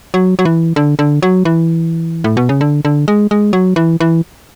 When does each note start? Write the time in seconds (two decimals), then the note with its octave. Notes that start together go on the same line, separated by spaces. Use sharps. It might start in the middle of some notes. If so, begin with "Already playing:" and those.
0.14 F#3
0.39 F#3
0.45 E3
0.76 D3
0.99 D3
1.23 F#3
1.45 E3
2.24 A2
2.37 B2
2.49 C#3
2.61 D3
2.85 D3
3.08 G#3
3.31 G#3
3.53 F#3
3.76 E3
4.00 E3